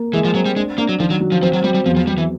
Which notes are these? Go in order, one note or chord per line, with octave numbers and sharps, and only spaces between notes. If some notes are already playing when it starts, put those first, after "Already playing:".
Already playing: A#3
E3 G#3
F3
F#3 C4
G3
G#3 D4
A#3 D4
F#3
D#3 F3
F#3
F#3
F3
F3 C4
F#3
F#3 G3
G3
E2 F3
F3
E2 G3
E3